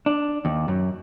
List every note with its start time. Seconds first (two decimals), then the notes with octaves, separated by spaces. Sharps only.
0.06 D4
0.45 D#2
0.68 F#2